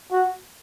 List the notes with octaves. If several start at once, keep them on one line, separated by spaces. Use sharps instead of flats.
F#4